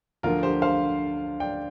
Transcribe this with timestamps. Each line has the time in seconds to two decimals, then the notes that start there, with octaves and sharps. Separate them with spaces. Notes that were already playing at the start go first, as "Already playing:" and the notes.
0.23 D2 D3 F3 F4 A#4
0.43 G4 C5
0.62 C5 F5
1.40 D5 G5